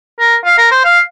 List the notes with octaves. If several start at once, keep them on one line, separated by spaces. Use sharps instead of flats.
A#4
F5
A#4
C5
F5